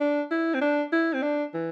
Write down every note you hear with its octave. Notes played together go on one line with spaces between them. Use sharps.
D4
E4
C4
D4
E4
C4
D4
E3